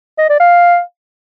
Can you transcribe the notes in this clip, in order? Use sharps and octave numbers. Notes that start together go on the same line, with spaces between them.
D#5
D5
F5